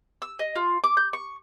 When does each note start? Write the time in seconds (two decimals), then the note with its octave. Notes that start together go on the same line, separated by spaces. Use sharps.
0.22 E6
0.39 D#5
0.56 F4
0.84 D6
0.97 G6
1.13 C#6